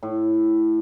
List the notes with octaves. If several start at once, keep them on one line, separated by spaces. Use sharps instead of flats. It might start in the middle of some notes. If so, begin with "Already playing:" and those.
A2